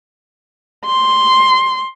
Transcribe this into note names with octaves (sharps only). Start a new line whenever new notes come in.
C6